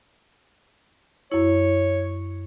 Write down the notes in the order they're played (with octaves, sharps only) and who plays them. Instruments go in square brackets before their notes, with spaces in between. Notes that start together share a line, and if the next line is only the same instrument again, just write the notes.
[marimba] F#2 E4 [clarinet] C#5